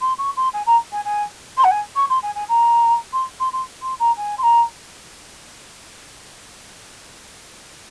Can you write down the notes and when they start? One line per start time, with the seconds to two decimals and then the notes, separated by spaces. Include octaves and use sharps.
0.01 C6
0.18 C#6
0.37 C6
0.54 G#5
0.67 A#5
0.92 G#5
1.05 G#5
1.58 C6
1.64 F#5
1.71 G#5
1.96 C#6
2.10 C6
2.23 G#5
2.35 G#5
2.49 A#5
3.13 C6
3.40 C6
3.53 C6
3.82 C6
4.00 A#5
4.17 G#5
4.38 C6
4.43 A#5